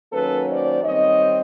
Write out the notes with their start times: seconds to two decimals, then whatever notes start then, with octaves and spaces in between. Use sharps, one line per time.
0.12 D#3 F#3 A#3 C#4 A4 B4
0.48 C5 D5
0.82 D#3 G3 C4 C#5 D#5